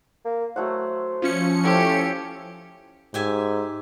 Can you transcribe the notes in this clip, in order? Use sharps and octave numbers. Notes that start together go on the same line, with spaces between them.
A#3
F#3 A3 C5 F#5
F3 C#4 C#7
A3 E4 G4 C5
G#2 G4 E5 G#5